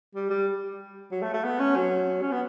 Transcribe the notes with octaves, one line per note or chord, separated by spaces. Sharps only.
G3
G3
F#3
A3
A3
B3
C#4
F#3
C#4
B3